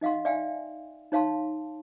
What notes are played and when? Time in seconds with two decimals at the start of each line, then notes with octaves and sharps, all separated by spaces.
0.01 D#4 D#5 F5 F#5 C6
0.25 D5 E5 F5 G5 G#5
1.12 D#4 C#5 F5 A5 C6